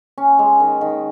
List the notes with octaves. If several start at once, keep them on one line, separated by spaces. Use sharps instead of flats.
C#4
G#3
D#3
D#3